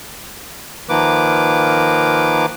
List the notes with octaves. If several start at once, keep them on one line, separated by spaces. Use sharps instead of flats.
D#3 F3 A#3 B4 D6